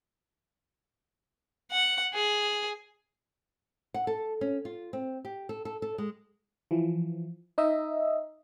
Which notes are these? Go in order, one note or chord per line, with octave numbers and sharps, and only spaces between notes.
F#5
G#4
F#5
A4
C#4
F4
C4
G4
A4
A4
A4
G#3
E3 F3
D#4 D#5 E5